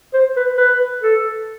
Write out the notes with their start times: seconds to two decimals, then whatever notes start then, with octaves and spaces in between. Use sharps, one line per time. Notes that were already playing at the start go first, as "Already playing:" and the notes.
0.14 C5
0.36 B4
0.57 B4
1.02 A4